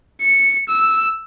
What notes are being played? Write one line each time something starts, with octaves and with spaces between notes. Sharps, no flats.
C#7
E6